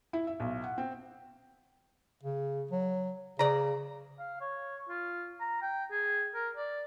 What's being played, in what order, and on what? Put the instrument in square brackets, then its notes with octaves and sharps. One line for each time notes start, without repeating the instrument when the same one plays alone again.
[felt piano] E4
E5
B1
F#5
C4
[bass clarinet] C#3
F#3
[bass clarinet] C#3 [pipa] D5 A#5
[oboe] F5
C#5
F4
A#5
G5
G#4
A#4
D5